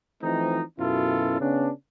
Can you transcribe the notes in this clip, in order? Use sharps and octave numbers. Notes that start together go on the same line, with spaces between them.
E3 F3 A3 C4 D#4
F#2 B2 C#4 E4 F4 A4
C#3 B3 C#4 D4